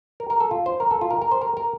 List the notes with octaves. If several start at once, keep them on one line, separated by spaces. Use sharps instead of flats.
A#4
A#4
A4
F4
C5
A#4
A4
F4
A#4
A#4
C5
A#4
A#4